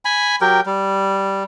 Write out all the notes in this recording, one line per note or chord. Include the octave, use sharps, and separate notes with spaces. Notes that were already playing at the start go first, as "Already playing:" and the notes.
G#5 B5
F#3 G4 A#4 G5
G3